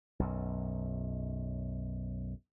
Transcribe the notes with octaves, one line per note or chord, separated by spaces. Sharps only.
B1 F#2